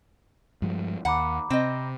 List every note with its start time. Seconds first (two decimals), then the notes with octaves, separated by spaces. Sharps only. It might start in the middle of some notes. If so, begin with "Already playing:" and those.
0.62 G2 F3 G#3
1.05 D#2 F#5 A#5 B5 D6
1.50 C3 C4 D#5